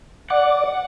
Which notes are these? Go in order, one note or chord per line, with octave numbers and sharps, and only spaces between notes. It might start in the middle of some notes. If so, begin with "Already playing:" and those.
D5 F#5 D6